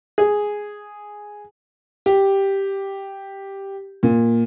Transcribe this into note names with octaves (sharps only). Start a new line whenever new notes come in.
G#4
G4
A#2